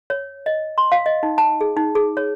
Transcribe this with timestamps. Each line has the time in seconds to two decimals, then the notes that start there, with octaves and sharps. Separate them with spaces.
0.10 C#5
0.46 D#5
0.78 C6
0.92 F5
1.06 D#5
1.23 D#4
1.38 A5
1.61 G#4
1.77 D#4
1.95 G#4
2.17 C#5